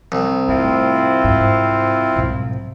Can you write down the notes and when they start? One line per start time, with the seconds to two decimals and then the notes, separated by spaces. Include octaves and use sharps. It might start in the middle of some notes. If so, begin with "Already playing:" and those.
0.12 C2
0.48 A2 C4 E4 F4
1.24 G#2
2.16 B1 G#2